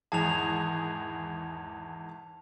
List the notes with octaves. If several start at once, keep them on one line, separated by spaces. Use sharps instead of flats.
G#1 E2 G#4 A5 F7